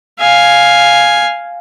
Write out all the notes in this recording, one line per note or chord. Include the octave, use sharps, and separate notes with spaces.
F5 G#5